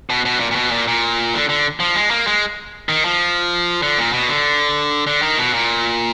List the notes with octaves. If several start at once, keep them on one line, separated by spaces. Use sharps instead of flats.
B2
B2
A#2
A#2
B2
A#2
A#2
D3
D3
F3
G#3
A#3
G#3
D#3
F3
D3
A#2
B2
D3
D3
D#3
B2
A#2